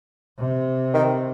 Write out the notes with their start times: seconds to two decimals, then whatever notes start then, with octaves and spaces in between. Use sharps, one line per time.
0.39 C3
0.94 D#3